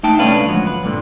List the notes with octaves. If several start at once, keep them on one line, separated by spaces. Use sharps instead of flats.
A3 D#4 G5 A5
C2 A3 C#4 D4 B4 F5
D2 G#2 F3 F#3 B3
B4
G2 A#2 D3